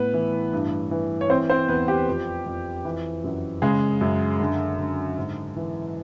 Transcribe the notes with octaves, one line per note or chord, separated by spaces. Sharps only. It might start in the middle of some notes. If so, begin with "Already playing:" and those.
Already playing: A2 B3 B4
E3
G2
E3
C#5
E3 C4 C5
C4 C5
E2 B3 B4
G4
F2
F2
E3
F#2
C#3 G#3 G#4
F#2
D3
D3
G#2
E3